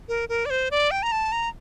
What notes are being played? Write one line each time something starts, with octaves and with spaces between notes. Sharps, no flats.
A#4
A#4
D5
C5
D5
G5
A#5
A5
A#5